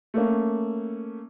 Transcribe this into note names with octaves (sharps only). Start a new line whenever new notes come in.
A3 A#3 C#4